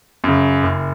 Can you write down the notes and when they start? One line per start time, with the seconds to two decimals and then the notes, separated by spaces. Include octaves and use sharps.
0.24 F#2 C#3
0.63 F#1